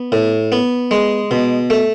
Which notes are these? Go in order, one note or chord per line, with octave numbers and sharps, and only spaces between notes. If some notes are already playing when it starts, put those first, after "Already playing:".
Already playing: B3
A2
B3
G#3
B2
A3